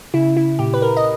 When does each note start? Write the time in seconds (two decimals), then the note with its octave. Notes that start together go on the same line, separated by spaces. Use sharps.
0.14 C#3 E4
0.37 E4
0.59 A#2 G4
0.74 B4
0.82 A#4
0.97 D#5